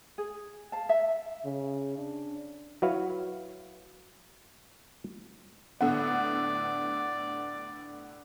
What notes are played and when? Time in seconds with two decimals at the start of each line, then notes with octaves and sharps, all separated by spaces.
0.18 G#4
0.72 F5 A5
0.89 E5
1.45 C#3
1.98 D4
2.82 F#3 E4 F#4 B4 F5
5.81 A2 D3 B3 D5 F#5